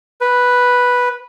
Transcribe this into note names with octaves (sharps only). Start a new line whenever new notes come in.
B4